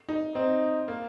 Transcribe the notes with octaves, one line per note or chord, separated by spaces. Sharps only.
D#4
C4 D#4
A#3